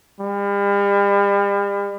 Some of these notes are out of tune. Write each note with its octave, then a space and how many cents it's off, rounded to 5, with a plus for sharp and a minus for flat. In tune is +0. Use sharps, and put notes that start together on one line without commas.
G3 +40